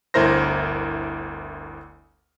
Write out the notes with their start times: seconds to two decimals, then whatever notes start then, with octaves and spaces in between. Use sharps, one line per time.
0.14 G1 D2 E4 A#4 C5 A#6